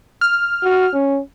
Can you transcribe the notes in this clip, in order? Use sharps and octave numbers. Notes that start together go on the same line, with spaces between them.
F6
F#4
C#4